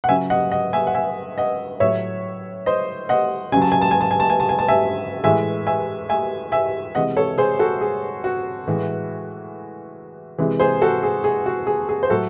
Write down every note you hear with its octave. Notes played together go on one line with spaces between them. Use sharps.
F#5
C#3 F#3 E5 G#5
D#5 F#5
D#5 F#5
E5 G#5
F#5
E5 G#5
D#5 F#5
A2 F#3 C#5 E5
C5 D#5
D#5 F#5
C#3 F#3 G#5
A5
G#5
A5
G#5
A5
G#5
A5
G#5
A5
G#5
A5
E5 G#5
A2 E3 G#3 E5 G#5
E5 G#5
E5 G#5
E5 G#5
C3 E3 G#3 D#5 F#5
A4 C#5
G#4 C5
F#4 A4
G#4
F#4
A2 E3 G#3
C3 E3 G#3
G#4 C5
F#4 A4
G#4
G#4
F#4
G#4
G#4
C5
A2 F#3 F#4 A4